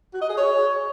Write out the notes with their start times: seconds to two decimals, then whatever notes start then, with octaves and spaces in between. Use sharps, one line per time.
0.13 F#4
0.22 D#5
0.30 G#4
0.38 C#5